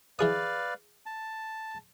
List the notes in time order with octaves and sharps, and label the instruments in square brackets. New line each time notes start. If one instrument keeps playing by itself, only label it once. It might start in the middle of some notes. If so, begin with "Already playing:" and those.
[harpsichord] E3 G#4 D#6 [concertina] B4 D5 F5
[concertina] A5